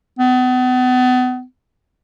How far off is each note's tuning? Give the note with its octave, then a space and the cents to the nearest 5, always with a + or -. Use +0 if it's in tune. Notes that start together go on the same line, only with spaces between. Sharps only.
B3 +35